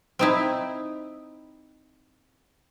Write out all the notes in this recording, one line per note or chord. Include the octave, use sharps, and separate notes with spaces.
C4 D#4 E4